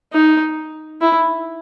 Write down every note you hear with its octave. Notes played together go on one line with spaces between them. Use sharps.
D#4
E4